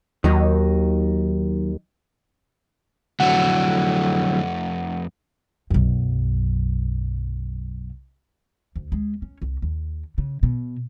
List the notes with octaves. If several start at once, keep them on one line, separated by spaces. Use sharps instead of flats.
D#2 D#3 F#3 D#4
F2 D3 F#3 A3 F#5
B1 F#2
D2
G#3
C#4
C2
D#2
C#3
B2